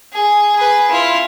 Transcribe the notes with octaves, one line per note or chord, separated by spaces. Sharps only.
G#4
G#4 B4
E4 F4